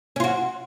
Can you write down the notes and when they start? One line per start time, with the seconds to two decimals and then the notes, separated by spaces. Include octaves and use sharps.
0.16 C#4
0.20 F4
0.24 F#4